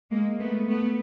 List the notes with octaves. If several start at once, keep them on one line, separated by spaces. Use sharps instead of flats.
G#3 A#3
A3 B3
A3 B3